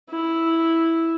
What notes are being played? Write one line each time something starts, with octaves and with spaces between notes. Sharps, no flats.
E4